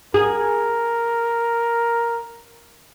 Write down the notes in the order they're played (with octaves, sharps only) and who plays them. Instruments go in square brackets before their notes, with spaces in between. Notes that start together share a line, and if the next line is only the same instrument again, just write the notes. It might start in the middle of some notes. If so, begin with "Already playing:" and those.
[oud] G#4 [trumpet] A#4